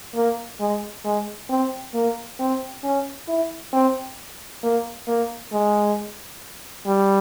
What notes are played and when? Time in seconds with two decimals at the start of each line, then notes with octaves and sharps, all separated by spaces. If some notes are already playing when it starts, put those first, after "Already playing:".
0.15 A#3
0.60 G#3
1.04 G#3
1.50 C4
1.94 A#3
2.40 C4
2.84 C#4
3.28 E4
3.73 C4
4.63 A#3
5.08 A#3
5.52 G#3
6.87 G3